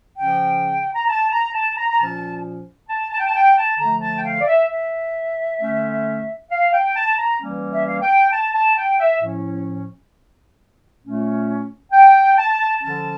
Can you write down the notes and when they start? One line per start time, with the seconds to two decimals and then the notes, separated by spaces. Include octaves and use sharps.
0.18 C#3 F3 C#4 G5
0.95 A#5
1.08 A5
1.31 A#5
1.54 A5
1.77 A#5
1.90 A#5
1.99 A#2 F3 C#4 A5
2.89 A5
3.12 A5
3.19 G5
3.26 A5
3.35 G5
3.58 A5
3.79 D3 F3 A3 A#5
4.02 A5
4.17 G5
4.25 F5
4.40 D5
4.47 E5
4.71 E5
5.60 D3 A3 C#4
6.50 F5
6.73 G5
6.96 A5
7.18 A#5
7.41 E3 G3 A#3 C#4
7.74 E5
7.88 F5
8.01 G5
8.32 A5
8.54 A5
8.77 G5
9.00 E5
9.21 A2 F3 C#4
11.02 A#2 A3 C#4
11.92 G5
12.37 A5
12.82 D3 F3 C#4 A5